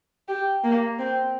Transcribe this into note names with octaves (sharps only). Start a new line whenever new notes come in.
G4
A#3
C4